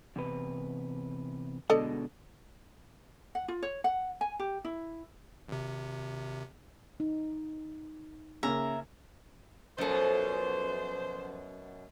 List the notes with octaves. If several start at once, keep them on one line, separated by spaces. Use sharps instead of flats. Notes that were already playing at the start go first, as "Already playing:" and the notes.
E2 C3 B4
B2 D3 G#3 A4 D5 D#5
F#5
F4
C#5
F#5
G#5
G4
E4
G#1 C3
D#4
C#3 A#3 E5 A#5
F#2 B2 F3 B3 A4 C5